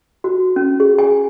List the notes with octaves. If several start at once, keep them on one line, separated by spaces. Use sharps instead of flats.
F#4
C#4
G#4
G#5